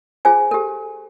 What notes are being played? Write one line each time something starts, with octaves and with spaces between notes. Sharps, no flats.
F4 G#4 C5 G#5
G4 A4